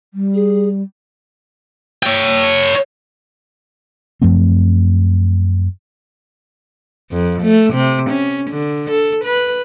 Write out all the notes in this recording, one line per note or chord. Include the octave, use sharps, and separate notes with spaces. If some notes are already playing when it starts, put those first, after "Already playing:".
G3
G#4
C#5 G5
F#2 F3 A3 C4
F2
A3
C3
C#4
D3
A4
B4